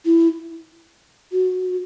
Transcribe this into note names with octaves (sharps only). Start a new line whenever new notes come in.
E4
F#4